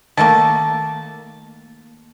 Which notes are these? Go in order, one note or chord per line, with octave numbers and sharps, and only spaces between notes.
D#3 A3 A#3 A5